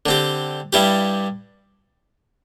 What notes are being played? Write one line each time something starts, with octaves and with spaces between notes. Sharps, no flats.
D3 C4 G4
G2 G3 E4 G4